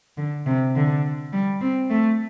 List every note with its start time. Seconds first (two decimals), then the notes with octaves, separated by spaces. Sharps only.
0.17 D3
0.46 C3
0.76 D3
1.33 G3
1.61 C4
1.90 A3